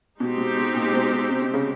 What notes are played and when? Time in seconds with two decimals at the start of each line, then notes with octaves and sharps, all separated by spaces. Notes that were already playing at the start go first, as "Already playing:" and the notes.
0.20 B2 G#3 C4 D#4 G4 C5
0.38 B2
0.57 B2
0.75 A#2
0.93 B2
1.11 B2
1.30 C3
1.42 C3
1.54 C#3